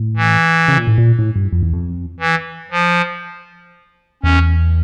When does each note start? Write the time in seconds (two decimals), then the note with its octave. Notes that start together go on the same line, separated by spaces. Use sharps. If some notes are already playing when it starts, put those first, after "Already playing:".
Already playing: A2
0.17 E3
0.68 C#3
0.78 A#2
0.87 A2
0.98 A#2
1.19 A2
1.36 G2
1.52 F2
1.63 E2
1.73 F2
2.20 E3
2.71 F3
4.23 E2 C#4